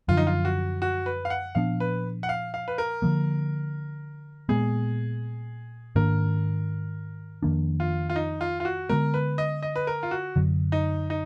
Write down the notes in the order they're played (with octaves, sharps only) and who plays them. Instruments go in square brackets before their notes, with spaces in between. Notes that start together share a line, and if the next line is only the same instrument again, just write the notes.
[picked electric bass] F#2 D3 F3 [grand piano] F4
[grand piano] D#4
F4
F#4
F#4
B4
F5
F#5
[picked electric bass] A#2 F3 B3 D4 [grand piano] F5
[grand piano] B4
F#5
F5
F5
B4
A#4
[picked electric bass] D3 F3 A#3
[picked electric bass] A#2 G#3 B3 [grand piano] G#4
[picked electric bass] G#2 D#3 A#3 D4 [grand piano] A#4
[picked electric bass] F2 D#3 A#3 D4
[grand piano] F4
F4
D#4
F4
F4
F#4
[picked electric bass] D3 G#3 B3 [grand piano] A#4
[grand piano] B4
D#5
D#5
B4
A#4
F4
F#4
[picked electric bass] F#2 D3 F#3
[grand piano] D#4
D#4